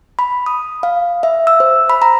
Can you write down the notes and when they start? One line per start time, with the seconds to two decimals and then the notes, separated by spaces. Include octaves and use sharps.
0.19 B5
0.46 D#6
0.83 F5
1.23 E5
1.47 E6
1.60 C5
1.90 B5
2.02 A#5